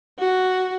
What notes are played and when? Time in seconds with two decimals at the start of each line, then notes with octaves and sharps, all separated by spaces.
0.19 F#4